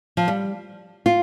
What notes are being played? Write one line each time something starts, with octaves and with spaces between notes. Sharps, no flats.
F3
G3
F4